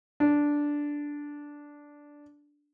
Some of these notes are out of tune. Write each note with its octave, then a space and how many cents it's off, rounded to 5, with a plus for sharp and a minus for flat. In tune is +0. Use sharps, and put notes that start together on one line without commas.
D4 -5